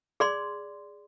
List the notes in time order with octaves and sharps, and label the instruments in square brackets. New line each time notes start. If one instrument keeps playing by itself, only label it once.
[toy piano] G#4 D5 C6